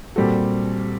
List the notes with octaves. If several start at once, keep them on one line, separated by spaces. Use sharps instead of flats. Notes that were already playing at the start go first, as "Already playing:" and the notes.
A#2 G3 C4 F#4 A4